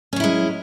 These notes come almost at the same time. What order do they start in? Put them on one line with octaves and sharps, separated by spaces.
C#4 F#3 E4 G#3